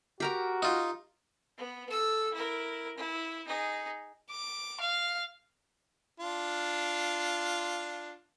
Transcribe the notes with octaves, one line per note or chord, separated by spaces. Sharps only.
F#4 G4 A#4 A#5
D#4 F4
B3
A4 E6
E4 A#4
E4
D#4 G#4
D6
F5
D4 F4